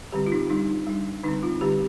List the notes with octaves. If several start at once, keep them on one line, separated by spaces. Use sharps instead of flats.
D3 G3 C4 G4
F4
D#4
G3 D4 D#4
G3 D4
D3 G3 C4 D#4
F4
D3 G3 C4 G4